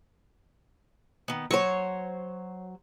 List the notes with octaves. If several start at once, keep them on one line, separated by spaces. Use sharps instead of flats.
D#3 B3
F#3 C5 C#5 C#6